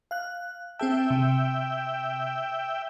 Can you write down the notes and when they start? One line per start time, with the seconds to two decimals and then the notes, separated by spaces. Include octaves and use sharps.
0.11 F5 F#6
0.79 C4 G#4 E5 G5 A5
1.10 C3